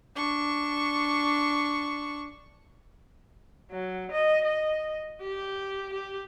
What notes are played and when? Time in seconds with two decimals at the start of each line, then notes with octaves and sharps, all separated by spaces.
0.15 D4 C#6
3.71 F#3
4.11 D#5
4.45 D#5
5.22 G4
5.93 G4